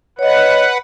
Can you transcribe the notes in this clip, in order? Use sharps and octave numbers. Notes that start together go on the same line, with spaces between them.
B4 C#5 D#5 F#5